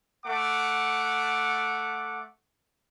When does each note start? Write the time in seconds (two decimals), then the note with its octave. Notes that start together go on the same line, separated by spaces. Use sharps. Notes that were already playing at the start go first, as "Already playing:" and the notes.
0.24 A3 F#5 D6